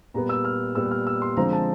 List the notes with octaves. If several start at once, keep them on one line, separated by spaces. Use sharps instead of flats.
A#2 G3 B3 A#5
E6
F6
A#2 G3 B3 E6
F6
E6
C6
D3 F3 G#3 C4 A#5
A5